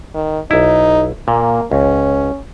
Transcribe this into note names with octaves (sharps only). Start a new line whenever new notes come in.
D#3
B1 D#4 E4
A#2 A#3
C#2 C#4